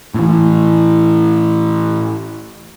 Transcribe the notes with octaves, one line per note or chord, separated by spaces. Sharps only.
A2 E3